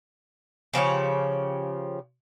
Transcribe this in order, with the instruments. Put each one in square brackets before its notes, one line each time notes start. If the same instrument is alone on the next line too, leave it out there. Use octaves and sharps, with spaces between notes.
[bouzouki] C#3 F3 G4 C#5